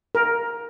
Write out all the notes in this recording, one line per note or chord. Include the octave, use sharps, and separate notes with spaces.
A#4